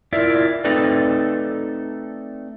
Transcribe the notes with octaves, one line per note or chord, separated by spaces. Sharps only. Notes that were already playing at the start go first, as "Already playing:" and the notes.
E4 F4 A#4 D5 E5
A3 C4 D#4 A4 B4 D5